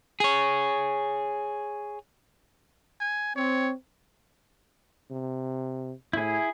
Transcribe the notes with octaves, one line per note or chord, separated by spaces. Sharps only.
G#4 C#5
G#5
C4 C#5
C3
A2 E4 G#4